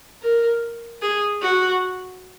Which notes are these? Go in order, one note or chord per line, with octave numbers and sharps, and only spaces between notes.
A#4
G#4
F#4